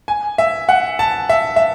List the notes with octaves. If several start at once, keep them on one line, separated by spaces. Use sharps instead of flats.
G#5
E5
F#5
A5
E5
E5